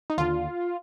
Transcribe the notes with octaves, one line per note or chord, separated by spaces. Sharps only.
D#4
D#2 D3 F4